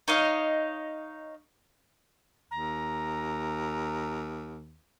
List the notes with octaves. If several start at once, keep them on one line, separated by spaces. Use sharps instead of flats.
D#4 C#5 D#5 F5
D#2 A#5